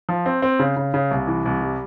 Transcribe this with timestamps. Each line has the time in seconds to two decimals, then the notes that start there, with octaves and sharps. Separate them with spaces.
0.09 F3
0.26 C4
0.42 C4
0.59 C#3
0.77 C#3
0.94 C#3
1.11 C2
1.27 E3
1.45 C2
1.62 G3